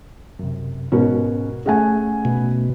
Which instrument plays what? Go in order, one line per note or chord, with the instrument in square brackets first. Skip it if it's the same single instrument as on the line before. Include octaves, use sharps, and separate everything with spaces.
[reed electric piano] F#2 C3
[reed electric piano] G#2 B2 C#4 [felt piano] F#4 A#4
[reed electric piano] A3 C#4 [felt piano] G#4 F#5 G#5
[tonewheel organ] B2